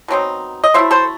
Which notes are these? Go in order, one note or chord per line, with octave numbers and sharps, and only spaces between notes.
B2 F#3 C4 D#4
D#5
F#3 A3 E4 C5 E5
A4 C5